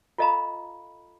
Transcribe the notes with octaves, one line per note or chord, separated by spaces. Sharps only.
F4 A4 D#5 F5 A#5 B5